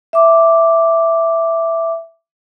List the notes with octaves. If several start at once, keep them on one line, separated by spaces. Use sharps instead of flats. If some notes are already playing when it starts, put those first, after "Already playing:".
E5 D6